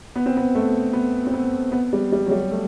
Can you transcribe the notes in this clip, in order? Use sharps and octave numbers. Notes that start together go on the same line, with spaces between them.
B3
C4
B3
A3
B3
C4
B3
B3
G3
G3
F#3
G3
A3